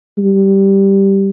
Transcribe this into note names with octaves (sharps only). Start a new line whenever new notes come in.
G3